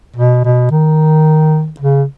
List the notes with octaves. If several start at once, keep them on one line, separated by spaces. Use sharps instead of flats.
B2
B2
D#3
C#3